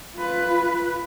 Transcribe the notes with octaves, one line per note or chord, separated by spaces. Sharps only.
F4 B4